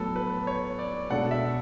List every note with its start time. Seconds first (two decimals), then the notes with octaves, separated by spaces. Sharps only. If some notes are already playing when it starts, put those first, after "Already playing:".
Already playing: A2 F#3 B3 A4
0.16 B4
0.47 C#5
0.79 D5
1.10 B2 G#3 D4 A4 D5 F#5
1.31 E5